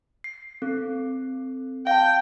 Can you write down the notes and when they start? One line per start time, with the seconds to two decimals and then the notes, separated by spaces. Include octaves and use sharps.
0.24 C7
0.62 C4 A4
1.87 F5 G5 A5